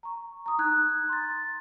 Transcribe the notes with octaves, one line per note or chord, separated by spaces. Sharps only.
A#5 C#6
A#5 D#6
D#4 A#5 F#6 G#6
C6 A6